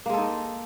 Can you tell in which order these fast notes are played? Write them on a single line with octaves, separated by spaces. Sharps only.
A#3 G#3 A4 D#4